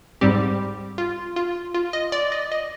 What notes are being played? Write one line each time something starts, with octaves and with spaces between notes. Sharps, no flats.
G#2 G3 C4 G4
F4
F4
F4
D#5
D5
D#5
D#5